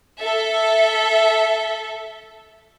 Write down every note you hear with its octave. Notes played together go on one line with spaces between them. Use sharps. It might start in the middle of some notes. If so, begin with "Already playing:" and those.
A4 E5